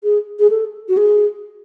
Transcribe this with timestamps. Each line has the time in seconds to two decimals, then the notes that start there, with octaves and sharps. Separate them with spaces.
0.04 G#4
0.40 G#4
0.50 A4
0.89 F#4
0.97 G#4